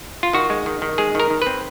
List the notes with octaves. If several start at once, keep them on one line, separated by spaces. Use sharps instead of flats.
F4
D#3 F#4
G#3
D#3
D#3
G#3 G#4
D#3 A#4
D#3
C4 B4